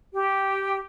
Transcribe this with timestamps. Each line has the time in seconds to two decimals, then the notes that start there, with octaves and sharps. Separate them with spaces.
0.12 G4